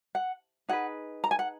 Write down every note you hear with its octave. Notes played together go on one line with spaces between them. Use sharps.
F#5
D#4 G#4 B4 F#5
A#5
G#5
F#5